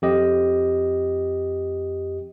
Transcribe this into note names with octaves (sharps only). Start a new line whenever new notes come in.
F2 G4 D#5